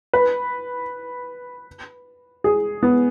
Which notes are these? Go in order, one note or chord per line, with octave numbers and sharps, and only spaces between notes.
B4
G#4
B3